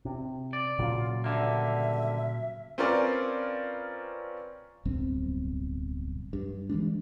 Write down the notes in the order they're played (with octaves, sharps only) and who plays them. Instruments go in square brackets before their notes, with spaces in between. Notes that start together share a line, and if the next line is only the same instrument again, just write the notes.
[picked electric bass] C3
[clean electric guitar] D5
[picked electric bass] A#2 C#3 F#3 [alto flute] F4
[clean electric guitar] G2 D3 A#3 [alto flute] E5
[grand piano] C4 C#4 F4 A#4 B4 D5
[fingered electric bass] D1 B1 G2 C4
G2
E3 F#3 G#3 D4